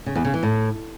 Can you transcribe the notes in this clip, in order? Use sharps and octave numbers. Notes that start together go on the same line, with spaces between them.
C#3
E2
C#3
E3
A2